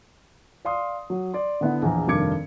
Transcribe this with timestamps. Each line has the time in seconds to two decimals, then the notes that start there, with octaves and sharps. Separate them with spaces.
0.65 D5 F5 C6 D#6
1.10 F#3
1.34 D5 C6
1.61 D3 B3 E4
1.82 A#1 E2 A#5
2.08 F1 G2 D#3 D6 G#6 C#7